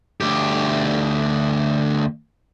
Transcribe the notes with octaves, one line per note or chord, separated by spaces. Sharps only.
D2 G4